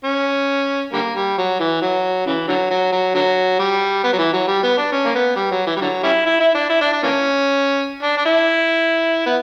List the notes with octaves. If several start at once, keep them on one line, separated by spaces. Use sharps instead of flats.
C#4
D3 G3 A#3
G3
F#3
E3
F#3
C#3 E3
D3 F#3
F#3
F#3
D3 F#3
G3
B3
F#3
E3
F#3
G3
B3
D4
C#4
A#3
B3
G3
F#3
E3
G3
D3 F#3
G3 C#4 E4
E4
E4
D4
E4
D4
D4
E3 A#3 C#4
D4
D4
E4
B3